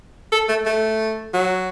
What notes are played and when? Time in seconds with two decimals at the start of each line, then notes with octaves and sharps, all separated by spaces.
0.32 A4
0.49 A3
0.66 A3
1.33 F#3